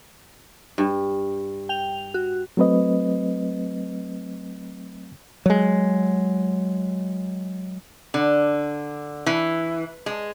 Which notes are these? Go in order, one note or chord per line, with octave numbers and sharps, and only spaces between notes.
G2
G5 F7
F#4
F#3 A3 C4 B4 D#5
F#3 G#3
D3
E3
G#3